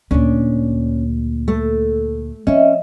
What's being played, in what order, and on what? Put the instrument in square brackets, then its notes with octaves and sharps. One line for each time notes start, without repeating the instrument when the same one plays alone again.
[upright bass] D2 A#2 [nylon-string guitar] C#4 D4
[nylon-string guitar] A3
[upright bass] F3 C4 [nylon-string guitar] C#4 [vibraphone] D#5 E5